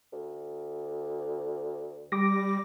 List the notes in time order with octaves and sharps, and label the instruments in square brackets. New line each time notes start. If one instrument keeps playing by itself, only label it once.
[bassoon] D2
[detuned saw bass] G3 [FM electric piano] D6 A#6